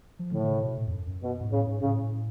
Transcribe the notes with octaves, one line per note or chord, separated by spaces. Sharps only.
F3
A2 D3
D3
C#3
B2
A2
F2
F#2
F#2
B2
G#2
A2 C#3
G#2
A2 C#3